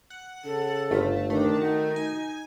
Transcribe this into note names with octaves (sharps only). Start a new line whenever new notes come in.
F#5
C#3 A4
G1 A3 F4
D#3 A3 D4
D#4 F#4
G#5